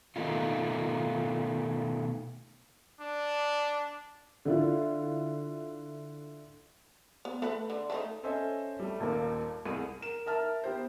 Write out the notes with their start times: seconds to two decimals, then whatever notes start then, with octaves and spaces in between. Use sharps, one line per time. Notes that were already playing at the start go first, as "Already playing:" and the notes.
0.16 B2 D#3 A3 D#4 F4
3.00 D4
4.45 D3 E4 F4
7.25 B3
7.42 A3 B4
7.70 D3
7.90 A3 C4 D#4
8.23 C#4 A4 C5 D#5 E5 G#5
8.80 G3 A3
9.00 D#1 D#2 A#3
9.66 C2 G#4 D#7
10.01 A#4 E7
10.26 A#4 E5 A5 F6
10.64 B3 G4 C5